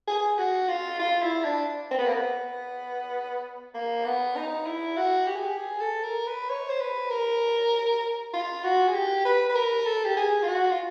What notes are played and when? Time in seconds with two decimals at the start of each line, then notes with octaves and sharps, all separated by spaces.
0.07 G#4
0.38 F#4
0.68 F4
0.99 F4
1.22 E4
1.44 D4
1.91 C4
1.99 B3
2.06 A#3
2.13 B3
3.74 A#3
4.05 B3
4.35 D#4
4.66 E4
4.97 F#4
5.27 G4
5.35 G#4
5.44 G4
5.58 G#4
5.80 A4
6.04 A#4
6.27 B4
6.50 C#5
6.69 C5
6.81 B4
7.11 A#4
8.33 F4
8.64 F#4
8.88 G#4
8.94 G4
9.25 B4
9.49 B4
9.55 A#4
9.86 A4
10.05 G4
10.17 G#4
10.43 F4
10.48 F#4
10.70 F4